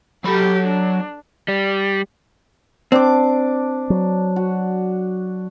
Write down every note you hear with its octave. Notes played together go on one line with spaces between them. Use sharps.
F#3 G4 A4 B5
D4
G3
C4 D4 D6
F#3
F#4